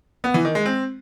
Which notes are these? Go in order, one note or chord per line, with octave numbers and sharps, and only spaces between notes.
B3
E3
D#3
G#3
C4